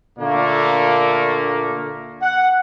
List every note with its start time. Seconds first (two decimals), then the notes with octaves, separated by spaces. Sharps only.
0.18 A#2 D3 A3 A#3
2.21 F#5